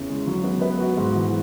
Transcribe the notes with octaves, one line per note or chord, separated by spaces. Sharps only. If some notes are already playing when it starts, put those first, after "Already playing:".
Already playing: E2 C#3 C#4 E4
G#3
F#3
B3
B4
F#4
G#2
E3